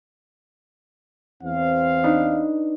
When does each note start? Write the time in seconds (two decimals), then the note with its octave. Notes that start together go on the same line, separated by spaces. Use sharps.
1.43 E2 C4 F5
2.04 D4 D#4 B4